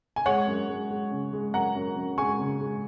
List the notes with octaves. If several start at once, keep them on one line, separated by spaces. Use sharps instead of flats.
G#5
G#3 C#5 F#5
F#2
G#3
G#3
C#3
G#3
F#2 F#5 A#5
F#2
F#2
G#3 G#5 C#6
C#3
G#3